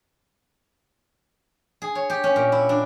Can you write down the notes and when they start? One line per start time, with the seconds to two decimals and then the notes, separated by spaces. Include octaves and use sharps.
1.82 G#4
1.95 C#5
2.10 G4
2.24 C#4
2.36 A#2
2.52 E4
2.69 D4